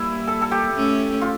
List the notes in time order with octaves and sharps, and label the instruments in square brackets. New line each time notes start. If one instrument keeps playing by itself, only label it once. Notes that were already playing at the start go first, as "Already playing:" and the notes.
Already playing: [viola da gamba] G3 A#3 [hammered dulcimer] E4
[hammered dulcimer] A4
A4
G4
[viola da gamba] A3 C#4
[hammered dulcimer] F4